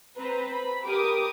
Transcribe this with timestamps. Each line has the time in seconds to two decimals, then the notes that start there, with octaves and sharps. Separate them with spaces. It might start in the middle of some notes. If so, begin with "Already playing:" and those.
0.18 C4 B4 C5 A#5
0.51 B5
0.84 G4 A#4 D6 D#6